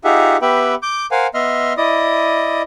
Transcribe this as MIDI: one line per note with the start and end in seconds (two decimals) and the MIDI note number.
0.04 0.37 63
0.04 0.37 65
0.04 0.37 67
0.04 0.37 68
0.04 0.37 76
0.04 0.37 78
0.42 0.75 59
0.42 0.75 67
0.42 0.75 71
0.42 0.75 76
0.42 0.75 79
0.42 0.75 83
0.83 1.06 86
0.83 1.06 91
1.11 1.27 70
1.11 1.27 72
1.11 1.27 77
1.11 1.27 78
1.11 1.27 80
1.34 1.73 59
1.34 1.73 75
1.34 1.73 76
1.34 1.73 84
1.34 1.73 89
1.77 2.62 64
1.77 2.62 74
1.77 2.62 75
1.77 2.62 87